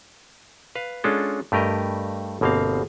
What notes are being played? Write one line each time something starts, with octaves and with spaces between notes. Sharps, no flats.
B4 F5
G#3 C#4 D4 F4 A4
G2 A3 G4 A#4 D#5
G1 B2 A#3 C4 F5